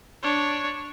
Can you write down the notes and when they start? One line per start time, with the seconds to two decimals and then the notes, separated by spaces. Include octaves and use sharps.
0.23 D4 C#5